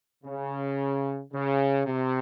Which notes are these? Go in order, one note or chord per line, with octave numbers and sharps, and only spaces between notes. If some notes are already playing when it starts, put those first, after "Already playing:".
C#3
C#3
C3